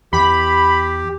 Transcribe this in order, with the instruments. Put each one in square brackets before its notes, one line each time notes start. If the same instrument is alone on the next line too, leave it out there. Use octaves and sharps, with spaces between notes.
[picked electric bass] E2 [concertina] G4 [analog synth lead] B5